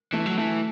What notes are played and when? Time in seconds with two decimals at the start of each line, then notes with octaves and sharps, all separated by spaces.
0.13 E3 A3
0.26 F#3
0.38 E3 A3